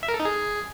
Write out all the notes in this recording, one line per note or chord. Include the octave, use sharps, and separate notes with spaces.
E5
A#4
A4
D#4
G#4